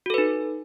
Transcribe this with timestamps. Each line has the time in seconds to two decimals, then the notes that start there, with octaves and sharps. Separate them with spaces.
0.06 F#4
0.10 A4
0.14 B4
0.18 D#4